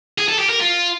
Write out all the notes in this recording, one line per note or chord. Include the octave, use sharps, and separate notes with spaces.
G#4
A4
G4
A#4
F4